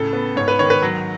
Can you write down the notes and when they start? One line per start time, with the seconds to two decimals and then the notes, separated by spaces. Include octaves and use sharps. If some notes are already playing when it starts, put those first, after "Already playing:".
Already playing: A2 C#3 A4
0.13 B3
0.36 G#2 C#5
0.48 B4
0.59 D#3 C#5
0.70 B4
0.82 F#3